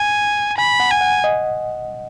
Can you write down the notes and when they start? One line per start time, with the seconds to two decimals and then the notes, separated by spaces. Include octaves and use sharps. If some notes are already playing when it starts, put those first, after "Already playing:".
Already playing: G#5
0.58 G#5 B5
0.80 F#5
0.91 G#5
1.01 F#5
1.24 D#5